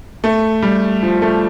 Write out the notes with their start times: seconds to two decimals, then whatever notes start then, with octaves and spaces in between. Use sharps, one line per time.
0.24 A3
0.62 G3
1.03 F3
1.22 A3